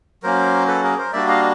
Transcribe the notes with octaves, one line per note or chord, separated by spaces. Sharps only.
F#3 A#3 C#4 A#4 C5
A4 B4
G#4 A#4
A#4 C5
G3 A#3 D4 F#4 D5 E5
D#5 F5